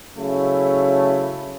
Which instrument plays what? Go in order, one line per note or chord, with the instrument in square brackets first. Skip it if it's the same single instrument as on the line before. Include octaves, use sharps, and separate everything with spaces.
[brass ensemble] C#3 F#3 A3 C#4 E4